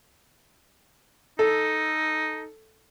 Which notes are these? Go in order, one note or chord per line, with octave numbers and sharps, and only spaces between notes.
D#4 A4